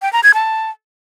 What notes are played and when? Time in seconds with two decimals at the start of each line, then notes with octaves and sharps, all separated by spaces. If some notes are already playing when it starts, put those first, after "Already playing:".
0.02 G5
0.13 A#5
0.23 G#6
0.34 A5